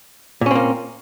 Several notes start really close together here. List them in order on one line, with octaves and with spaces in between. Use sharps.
A#2 C#4 C4 A#3